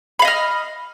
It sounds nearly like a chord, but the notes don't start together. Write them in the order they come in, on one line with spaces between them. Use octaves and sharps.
B5 F5 D#5 F6